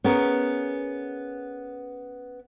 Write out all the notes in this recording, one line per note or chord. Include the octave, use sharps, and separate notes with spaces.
B3 C#4 G#4 A#4